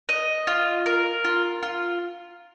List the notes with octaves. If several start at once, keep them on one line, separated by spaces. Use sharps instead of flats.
D#5
F4
A#4
F4
F4